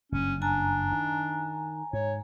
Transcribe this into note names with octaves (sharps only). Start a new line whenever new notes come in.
F#1 G2 C#4
D4 G#5 A#5
D#3
G#2 C#5